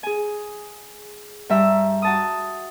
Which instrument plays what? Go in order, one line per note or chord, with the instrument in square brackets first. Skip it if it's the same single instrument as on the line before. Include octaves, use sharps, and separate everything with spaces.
[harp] G#4 G#5
G2 G3 E5 A#5
F#4 A5 D#6